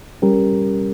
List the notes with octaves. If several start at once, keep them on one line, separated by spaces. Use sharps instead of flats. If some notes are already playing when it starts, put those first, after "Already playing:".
G3 C#4 G4 A#4